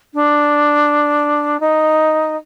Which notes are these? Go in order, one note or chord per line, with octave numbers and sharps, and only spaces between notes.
D4
D#4